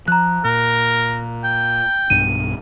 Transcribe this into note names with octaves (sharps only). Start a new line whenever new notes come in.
F3 A#5 F#6
A#2 A#4
G5
B1 G2 B2 D#7